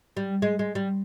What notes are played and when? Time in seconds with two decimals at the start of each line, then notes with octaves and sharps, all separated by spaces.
0.17 G3
0.42 G#3
0.59 G#3
0.75 G3